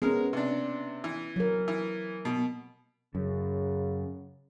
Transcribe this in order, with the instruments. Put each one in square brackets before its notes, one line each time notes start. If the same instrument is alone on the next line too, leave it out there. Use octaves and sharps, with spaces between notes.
[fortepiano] G#3 A#4 [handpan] B3 C#4
[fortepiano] C3 D4
E3
[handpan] F#3 A#4
[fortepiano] E3
B2
[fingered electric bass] F#2 [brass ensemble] C#3